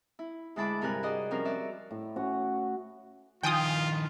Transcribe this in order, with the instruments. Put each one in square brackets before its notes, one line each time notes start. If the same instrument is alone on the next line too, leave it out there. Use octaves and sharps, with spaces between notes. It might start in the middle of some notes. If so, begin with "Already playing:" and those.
[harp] E4
D2 G#3 E4 A5 B5 D6
G2 C3 G3 A#4 G#5 F#6
F#4 G#4 D5 D#5
F3 G3 C4 C#4 A#4
F#4 D5 E5
[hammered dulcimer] A2
C#4 F#4
[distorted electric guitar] D#3 F3 [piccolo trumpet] F4 [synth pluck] G5 G#5 D#6